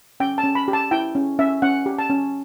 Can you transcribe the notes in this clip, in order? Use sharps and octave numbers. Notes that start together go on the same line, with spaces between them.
C#4 G5
A5
C#4
B5
G4
A5
E4 G5
C#4
C#4 E5
C#4 F#5
G4
A5
C#4